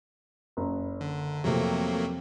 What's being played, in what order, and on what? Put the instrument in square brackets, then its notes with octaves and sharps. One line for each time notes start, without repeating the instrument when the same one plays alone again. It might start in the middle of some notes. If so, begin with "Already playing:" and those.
[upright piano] F#1
[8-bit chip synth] D3
[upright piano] F2 C3 [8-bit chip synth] F#3 A3 A#3